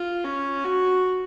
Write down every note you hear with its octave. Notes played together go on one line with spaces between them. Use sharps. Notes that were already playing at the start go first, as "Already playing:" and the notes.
Already playing: F4
C#4
F#4